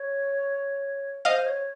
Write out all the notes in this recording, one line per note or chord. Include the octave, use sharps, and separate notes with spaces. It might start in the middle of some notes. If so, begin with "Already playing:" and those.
Already playing: C#5
C5 D#5 F5
C#5